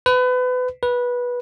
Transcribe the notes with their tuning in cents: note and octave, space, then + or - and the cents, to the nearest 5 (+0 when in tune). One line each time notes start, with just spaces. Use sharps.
B4 +30
B4 -15